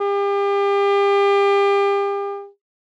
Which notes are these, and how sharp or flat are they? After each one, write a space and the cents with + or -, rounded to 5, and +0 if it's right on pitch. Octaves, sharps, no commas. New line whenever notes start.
G4 +35